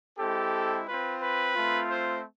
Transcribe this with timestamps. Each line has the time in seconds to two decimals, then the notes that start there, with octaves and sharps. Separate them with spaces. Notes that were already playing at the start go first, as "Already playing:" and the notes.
0.19 G#3 C4 E4 G4 A4
0.87 C4 F4 B4
1.22 B4
1.56 A3 C4 F4
1.90 C5